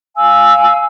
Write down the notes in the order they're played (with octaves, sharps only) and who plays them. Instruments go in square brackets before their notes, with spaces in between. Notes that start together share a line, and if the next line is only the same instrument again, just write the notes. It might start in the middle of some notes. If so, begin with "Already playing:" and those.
[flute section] F5 G#5 E6